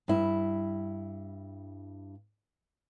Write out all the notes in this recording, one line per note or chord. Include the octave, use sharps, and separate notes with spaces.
G2 E4